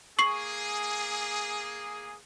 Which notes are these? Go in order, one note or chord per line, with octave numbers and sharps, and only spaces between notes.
A#3 G#4 C#6 C7 F#7